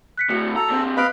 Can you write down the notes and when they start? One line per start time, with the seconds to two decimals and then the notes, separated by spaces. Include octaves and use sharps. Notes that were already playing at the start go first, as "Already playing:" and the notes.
0.17 F#6 B6 C#7
0.29 D2 A2 F#4 C#7
0.56 A4 A#5
0.68 A#2 C4
0.97 B4 D#5 F5 B5 F#6 D7